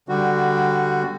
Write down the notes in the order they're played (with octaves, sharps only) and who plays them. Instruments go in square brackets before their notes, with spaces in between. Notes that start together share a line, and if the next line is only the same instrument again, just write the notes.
[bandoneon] D3 G3 F#4